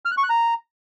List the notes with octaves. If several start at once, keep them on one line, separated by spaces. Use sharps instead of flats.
F6
F#6
C#6
F#6
A#5